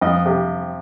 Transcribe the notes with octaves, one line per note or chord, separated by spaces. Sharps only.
F2 D#5
C3